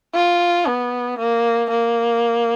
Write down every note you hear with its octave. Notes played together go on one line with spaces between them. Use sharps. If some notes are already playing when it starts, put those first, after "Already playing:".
F4
B3
A#3
A#3